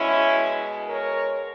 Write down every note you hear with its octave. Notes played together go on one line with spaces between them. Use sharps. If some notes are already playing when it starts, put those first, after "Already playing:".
Already playing: B2 G#3 C#4 E4
A#4 C#5